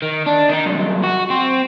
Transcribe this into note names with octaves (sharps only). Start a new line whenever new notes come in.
D#3
D4
D#3 D#4
C2 F#2
F#4
C4